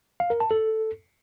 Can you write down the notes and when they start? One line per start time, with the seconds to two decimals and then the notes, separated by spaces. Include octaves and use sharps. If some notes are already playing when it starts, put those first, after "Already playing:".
0.20 F5
0.30 A#4
0.40 A5
0.51 A4